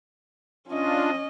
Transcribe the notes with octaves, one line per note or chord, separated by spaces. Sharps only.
C#4 D4 F4 D#5